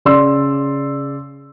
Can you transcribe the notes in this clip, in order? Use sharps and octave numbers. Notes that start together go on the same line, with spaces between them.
C#3 D5 C6 E6